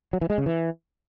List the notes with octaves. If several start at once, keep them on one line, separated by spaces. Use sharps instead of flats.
F#3
E3
G#3
C#3
E3